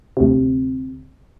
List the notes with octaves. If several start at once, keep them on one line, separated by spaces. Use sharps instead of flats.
D2 C3